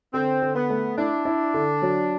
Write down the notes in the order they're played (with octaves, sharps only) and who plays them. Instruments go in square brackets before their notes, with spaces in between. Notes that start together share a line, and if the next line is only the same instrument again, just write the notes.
[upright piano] D3 [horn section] C4
[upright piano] D3
[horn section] B3
[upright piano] A3
[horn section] D4 [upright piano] E4
[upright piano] E4
D3
F#3